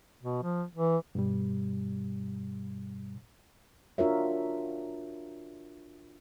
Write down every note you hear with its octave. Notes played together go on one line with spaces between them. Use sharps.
B2
F3
E3
G2 B2 G3
D4 F4 F#4 A#4 C#5 E5